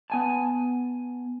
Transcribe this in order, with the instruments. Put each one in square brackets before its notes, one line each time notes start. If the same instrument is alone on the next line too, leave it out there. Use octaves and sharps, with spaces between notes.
[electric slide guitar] B3 G#5 A5